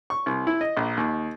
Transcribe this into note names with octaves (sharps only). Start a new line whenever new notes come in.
C#6
C2
E4
D#5
A#1
D#2